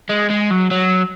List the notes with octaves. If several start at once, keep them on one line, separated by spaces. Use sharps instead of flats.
G#3
G#3
F#3
F#3